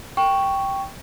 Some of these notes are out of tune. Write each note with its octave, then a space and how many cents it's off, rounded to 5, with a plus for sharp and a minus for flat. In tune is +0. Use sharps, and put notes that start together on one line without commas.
G5 +0 C#6 +0